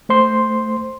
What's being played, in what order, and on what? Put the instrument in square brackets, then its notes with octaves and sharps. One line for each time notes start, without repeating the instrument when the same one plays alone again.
[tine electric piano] A3 C5 C6